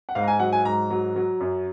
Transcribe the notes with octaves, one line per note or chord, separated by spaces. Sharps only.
F#5
G#2 F5
A#5
G#5
F#3 F#5
G#5
G#2 A#5
F#3
F#3
F#2